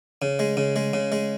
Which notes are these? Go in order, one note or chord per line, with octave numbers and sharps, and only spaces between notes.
C#3
G#3
C#3
G#3
C#3
G#3